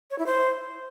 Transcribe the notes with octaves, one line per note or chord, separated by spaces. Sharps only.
C#5
E4
C5